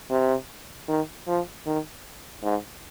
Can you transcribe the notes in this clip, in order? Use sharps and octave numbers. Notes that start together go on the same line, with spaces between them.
C3
D#3
F3
D#3
G#2